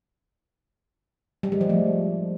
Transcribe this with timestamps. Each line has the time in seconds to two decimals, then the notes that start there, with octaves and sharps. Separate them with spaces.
1.43 G3
1.52 G#3
1.61 F3
1.69 A3